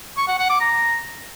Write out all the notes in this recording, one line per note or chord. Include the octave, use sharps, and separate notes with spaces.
C#6
F#5
F#5
D6
A#5